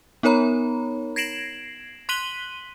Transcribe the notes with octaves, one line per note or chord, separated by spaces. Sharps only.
B3 D#4 A#4 C#5 A#5 B5
G#6 A#6 C7 D7 E7 F#7
C6 F#6 B6 D#7 F#7 G7